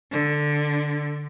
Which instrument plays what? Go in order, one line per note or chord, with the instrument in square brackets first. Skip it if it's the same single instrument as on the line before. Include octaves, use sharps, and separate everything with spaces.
[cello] D3